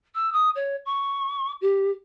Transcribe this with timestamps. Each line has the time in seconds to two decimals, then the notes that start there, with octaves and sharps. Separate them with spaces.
0.15 E6
0.33 D#6
0.56 C#5
0.86 C#6
1.61 G4